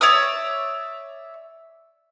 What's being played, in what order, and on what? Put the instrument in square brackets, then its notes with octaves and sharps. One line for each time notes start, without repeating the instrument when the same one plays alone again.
[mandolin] C#5 D5 E5 D#6